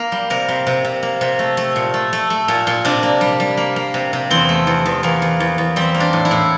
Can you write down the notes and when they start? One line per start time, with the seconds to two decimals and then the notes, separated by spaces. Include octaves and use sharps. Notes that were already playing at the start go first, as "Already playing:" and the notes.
Already playing: A#3 A#4
0.12 G3
0.30 C3 A#4
0.48 C3
0.67 C3
0.85 C3
1.03 A#3
1.21 C3
1.39 A3
1.57 A3
1.76 A#2
1.94 A3
2.13 A3
2.30 A3
2.48 A#2
2.67 A#2
2.85 C3 D4
3.03 A#3
3.21 G3
3.40 G3
3.57 A#3
3.76 A#3
3.94 C3
4.13 C3
4.30 E2 C4
4.49 A3
4.67 E2
4.85 E2
5.03 E2 A#3
5.22 E2
5.40 E2
5.58 E2
5.76 G3 C4
5.94 A#3
6.00 D4
6.13 A2
6.25 E4
6.31 A2